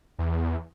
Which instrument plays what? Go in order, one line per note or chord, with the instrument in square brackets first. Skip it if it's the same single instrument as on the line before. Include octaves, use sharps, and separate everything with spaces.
[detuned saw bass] E2